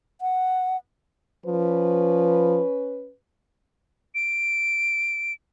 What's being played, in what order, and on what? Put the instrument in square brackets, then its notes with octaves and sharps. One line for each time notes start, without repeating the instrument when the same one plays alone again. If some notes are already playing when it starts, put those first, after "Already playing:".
[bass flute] F#5
[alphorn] F3 [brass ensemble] C#4 B4
[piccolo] D7